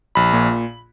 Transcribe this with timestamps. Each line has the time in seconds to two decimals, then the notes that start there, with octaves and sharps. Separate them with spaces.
0.15 A#1 B5
0.33 A#2